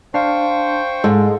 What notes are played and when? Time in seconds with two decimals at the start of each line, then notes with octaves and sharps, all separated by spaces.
0.14 D4 C5 F5 G5 C#6
1.04 G#2 G#3 A4